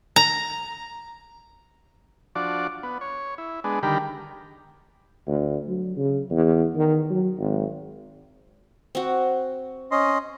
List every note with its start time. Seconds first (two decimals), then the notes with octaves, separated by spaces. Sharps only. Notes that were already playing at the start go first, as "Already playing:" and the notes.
0.16 A#5
2.35 F3 D4 F#4 D5
2.83 B3
3.01 C#5
3.38 E4
3.64 G#3 B3 D4
3.83 D3 D#3 G3 G4 A#4 B5
5.27 D2
5.68 F#3
5.97 C#3
6.30 E2
6.75 D#3
7.10 F#3
7.38 G#1
8.95 C4 F#4
9.91 C#4 D#5 C6